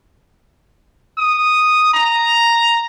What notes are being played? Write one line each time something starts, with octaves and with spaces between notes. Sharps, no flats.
D#6
A#5